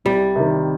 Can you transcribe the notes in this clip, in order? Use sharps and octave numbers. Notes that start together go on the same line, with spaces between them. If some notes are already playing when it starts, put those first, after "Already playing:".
C2 G3
C3 D#3